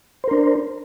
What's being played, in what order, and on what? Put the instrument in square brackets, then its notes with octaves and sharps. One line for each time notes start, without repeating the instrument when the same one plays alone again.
[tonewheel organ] C5
A#4
D4